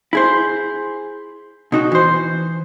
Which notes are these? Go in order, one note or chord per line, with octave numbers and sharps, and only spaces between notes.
E4 G#4 C5
B2 D#4 F#4
E3 C5